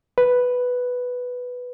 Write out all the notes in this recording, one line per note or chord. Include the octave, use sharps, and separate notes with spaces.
B4